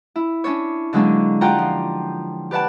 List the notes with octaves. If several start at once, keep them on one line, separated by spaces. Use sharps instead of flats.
E4
C#4 D4 C#5
D3 F#3 G#3 A#3 C#4 D4
F4 G4 D5 F#5 G5 A#5
F3
G4 B4 D5 F#5 A5